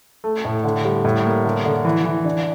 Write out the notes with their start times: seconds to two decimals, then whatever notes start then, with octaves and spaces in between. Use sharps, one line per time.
0.24 A3
0.45 A2
0.64 D3
0.85 G3
1.05 A2
1.25 A#3
1.44 D3
1.65 D3
1.85 E3
2.05 E3
2.25 D4